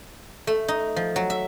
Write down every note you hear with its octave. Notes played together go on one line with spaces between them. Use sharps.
A3
D#4
F3
F#3
E5